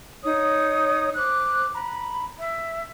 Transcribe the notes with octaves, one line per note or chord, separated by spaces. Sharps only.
D#4 C#5 D#6
C5 D6 F#6
A#5 B5
E5